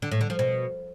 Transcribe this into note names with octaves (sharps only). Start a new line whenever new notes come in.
D3
A2
D3
F3
B2